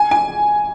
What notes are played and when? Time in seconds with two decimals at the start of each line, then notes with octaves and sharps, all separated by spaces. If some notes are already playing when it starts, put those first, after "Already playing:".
Already playing: G#5
0.11 G#5